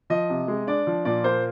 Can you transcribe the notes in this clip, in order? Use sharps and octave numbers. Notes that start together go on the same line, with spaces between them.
F3 D#5
C3
G#3
D4 D5
F3
A#2 D5
A#3 C5